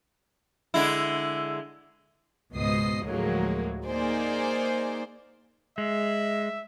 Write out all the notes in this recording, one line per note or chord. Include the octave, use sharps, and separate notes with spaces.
D3 G#3 E4
C#2 G#2 B2 D#5 D#6 C7
D2 A2 F3 F#3 G#3 A#3
A#3 D#4 G#4 C5 D5
G#3 E5